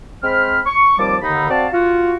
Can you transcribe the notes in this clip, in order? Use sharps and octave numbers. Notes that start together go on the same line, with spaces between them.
G#3 C4 C5 B5 F6
C#6
D#2 F3 G3 C4 A5 D6
D#2 D3 D#4 B5
C4 F#4 D5 F5 A5
F4 F#4